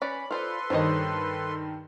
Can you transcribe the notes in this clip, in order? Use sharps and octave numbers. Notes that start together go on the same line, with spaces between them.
C#4 B4 D5 B5
F4 A4 B4 C5 D5 C6
G2 D#3 C5 C#5 D#5